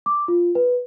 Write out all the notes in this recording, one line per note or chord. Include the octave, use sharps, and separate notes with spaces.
D6
F4
B4